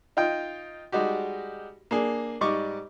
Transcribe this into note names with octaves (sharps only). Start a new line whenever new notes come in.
D#4 F4 D#5 G5
G3 G#3 D#4 F#4 G4
A#3 D4 G#4
G#2 G3 D#5 C#6 D6